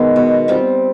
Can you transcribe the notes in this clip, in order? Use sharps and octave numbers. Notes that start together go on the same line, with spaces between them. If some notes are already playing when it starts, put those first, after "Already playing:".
Already playing: D#3 G#3 B3
B2
G3 C4 F4